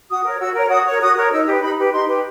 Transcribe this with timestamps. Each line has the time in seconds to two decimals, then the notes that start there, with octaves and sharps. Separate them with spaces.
0.09 F#4 D#6
0.24 A#4 C#5
0.40 F#4 E6
0.55 A#4 C#5
0.70 F#4 D#6
0.86 A#4 C#5
1.01 F#4 D#6
1.16 A#4 C#5
1.32 D#4 E6
1.47 G4 B4 D#6
1.62 D#4 B5
1.77 G4 B4
1.93 D#4 C6
2.08 G4 B4